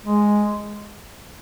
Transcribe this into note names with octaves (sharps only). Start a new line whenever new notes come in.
G#3